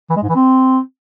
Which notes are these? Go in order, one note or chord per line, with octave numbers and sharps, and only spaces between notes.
E3
G#3
G#2
E3
C4